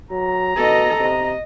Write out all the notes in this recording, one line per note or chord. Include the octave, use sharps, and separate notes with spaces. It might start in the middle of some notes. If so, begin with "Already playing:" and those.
F#3 A#5
B2 A4 D#5
C3 D#5